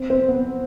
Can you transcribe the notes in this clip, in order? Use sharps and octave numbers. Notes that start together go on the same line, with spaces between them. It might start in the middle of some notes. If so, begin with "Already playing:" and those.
Already playing: C4
C4
B3